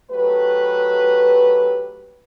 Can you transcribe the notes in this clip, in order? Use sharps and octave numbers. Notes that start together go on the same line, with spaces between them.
F#3 A3 G4 B4